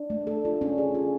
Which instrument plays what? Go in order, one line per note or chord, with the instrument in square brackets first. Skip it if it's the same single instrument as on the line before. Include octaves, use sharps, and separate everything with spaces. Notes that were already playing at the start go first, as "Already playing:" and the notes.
Already playing: [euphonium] D4
[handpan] A3
A4
F4
C#4
[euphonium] D4 [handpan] G#4
[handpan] F4